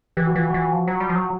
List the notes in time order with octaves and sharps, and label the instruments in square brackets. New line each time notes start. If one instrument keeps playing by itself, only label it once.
[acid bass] E3 [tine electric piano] G4
[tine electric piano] F#4
[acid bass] E3 [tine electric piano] F4
[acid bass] E3 [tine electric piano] F#4
[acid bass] F3
F#3
G3
F3
F#3